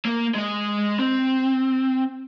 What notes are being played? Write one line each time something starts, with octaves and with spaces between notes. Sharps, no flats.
A#3 A#4
G#3 D#5
C4